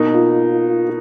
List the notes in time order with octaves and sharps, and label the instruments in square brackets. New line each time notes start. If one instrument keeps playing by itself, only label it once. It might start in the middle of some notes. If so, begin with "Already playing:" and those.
Already playing: [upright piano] B2 A#3 D#4
[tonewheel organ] F4